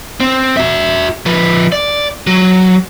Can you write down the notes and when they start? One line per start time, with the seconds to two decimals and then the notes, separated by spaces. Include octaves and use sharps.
0.20 C4
0.57 F#4 E5
1.26 F3 B4
1.72 D5
2.27 F#3